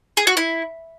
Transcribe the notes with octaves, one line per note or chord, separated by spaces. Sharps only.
G#4
F#4
E4